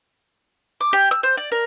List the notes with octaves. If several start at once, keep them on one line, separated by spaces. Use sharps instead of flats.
D6
G4
E6
C5
D5
A#4